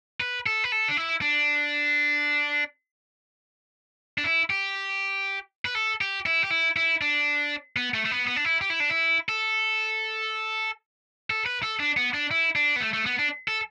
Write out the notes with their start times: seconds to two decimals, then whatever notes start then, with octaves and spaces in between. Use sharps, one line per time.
0.20 B4
0.46 A4
0.64 B4
0.72 A4
0.88 D4
0.97 E4
1.22 D4
4.18 D4
4.24 E4
4.50 G4
5.65 B4
5.75 A4
6.01 G4
6.26 E4
6.44 G4
6.50 E4
6.76 E4
7.02 D4
7.76 B3
7.94 A3
8.05 A3
8.11 B3
8.27 B3
8.36 D4
8.45 E4
8.61 G4
8.70 E4
8.80 D4
8.90 E4
9.29 A4
11.30 A4
11.46 B4
11.63 A4
11.80 D4
11.97 B3
12.14 D4
12.31 E4
12.56 D4
12.76 B3
12.80 A3
12.93 A3
13.06 B3
13.19 D4
13.48 A4